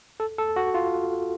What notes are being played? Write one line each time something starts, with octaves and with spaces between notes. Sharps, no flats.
A4
A4
F#4
F4